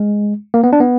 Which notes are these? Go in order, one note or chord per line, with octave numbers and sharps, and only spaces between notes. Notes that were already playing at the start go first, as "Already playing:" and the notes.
Already playing: G#3
A#3
B3
D4
B3